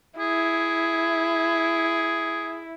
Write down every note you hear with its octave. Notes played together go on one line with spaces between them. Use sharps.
E4 G#4